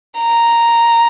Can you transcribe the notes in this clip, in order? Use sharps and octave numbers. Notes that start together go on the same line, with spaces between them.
A#5